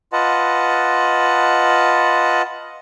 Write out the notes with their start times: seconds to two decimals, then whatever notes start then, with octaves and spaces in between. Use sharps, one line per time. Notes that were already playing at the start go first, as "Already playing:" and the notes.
0.13 F4 B4 D#5 F#5 A5